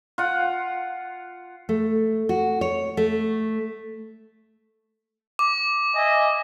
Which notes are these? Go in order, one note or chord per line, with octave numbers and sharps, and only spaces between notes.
F4 F#5
A3
F#4
C#5
A3
D6
D#5 E5 G#5